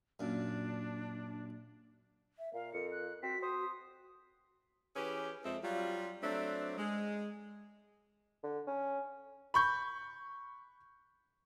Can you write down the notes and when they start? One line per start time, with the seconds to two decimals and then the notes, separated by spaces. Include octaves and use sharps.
0.20 F#2 A#2 D4
2.39 E5
2.54 A#2 A#4 F5
2.74 F2 C#7
2.92 F#6
3.23 C4 F#4 B6
3.42 C5 D#6
4.96 E3 C#4 G4 G#4 B4
5.45 F2 G#3 C4 A4 E5
5.63 F#3 G3 F4
6.23 F#3 A3 C4 D4
6.78 G#3
8.44 D3
8.67 C#4
9.54 B5 C#6 G6